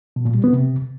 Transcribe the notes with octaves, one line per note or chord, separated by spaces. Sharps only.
B2
A#2
G3
B3
C3